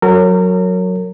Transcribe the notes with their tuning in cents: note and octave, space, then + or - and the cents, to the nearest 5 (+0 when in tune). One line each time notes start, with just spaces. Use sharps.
F#3 -10 A#4 -30 C#5 +0